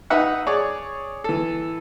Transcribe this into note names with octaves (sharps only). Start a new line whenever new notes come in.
D#4 B4 E5 F#5
G#4 C#5 D5
E3 A4